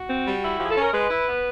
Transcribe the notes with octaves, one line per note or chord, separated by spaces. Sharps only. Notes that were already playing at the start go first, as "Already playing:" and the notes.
Already playing: F#4
C4
G3
E4
F3 G4
G#4
A4
C#4 A#4
G#3 B4
E4
B3